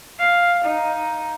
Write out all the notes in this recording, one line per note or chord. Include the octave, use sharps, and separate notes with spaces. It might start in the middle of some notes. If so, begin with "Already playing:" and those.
F5
D#4